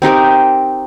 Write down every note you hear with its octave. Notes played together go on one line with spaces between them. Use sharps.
C4 D#4 G4 A#4